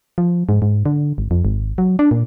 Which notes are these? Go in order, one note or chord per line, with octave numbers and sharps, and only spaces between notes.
F3
G#2
G#2
D3
G#1
F2
G#1
F#3
D4
A#2